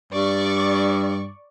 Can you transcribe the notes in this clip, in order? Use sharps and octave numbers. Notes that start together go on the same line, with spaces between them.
G2 D5 C#6